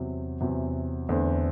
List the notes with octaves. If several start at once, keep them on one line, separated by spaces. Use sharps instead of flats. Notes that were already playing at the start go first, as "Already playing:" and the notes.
Already playing: E2 C3 F#3
E2 C3 F#3
E2 D3 A3 C4